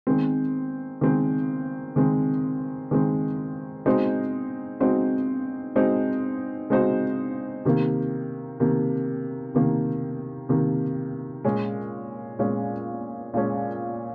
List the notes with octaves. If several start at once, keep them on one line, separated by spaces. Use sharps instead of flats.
D#3 G#3 C4
D#3 G#3 C4
D#3 G#3 C4
D#3 G#3 C4
G#3 C4 D#4 F#4 C5
G#3 C4 D#4 F#4 C5
G#3 C4 D#4 F#4 C5
G#3 C4 D#4 F#4 C5
C3 D#3 A#3
C3 D#3 A#3
C3 D#3 A#3
C3 D#3 A#3
A#2 G#3 C#4
A#2 G#3 C#4
A#2 G#3 C#4